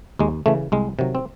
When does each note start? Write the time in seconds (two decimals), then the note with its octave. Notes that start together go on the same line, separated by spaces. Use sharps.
0.19 D#2 G#3
0.46 C#3 E3 A3
0.72 C2 G#3
0.99 C3 D#3 F#3
1.15 C4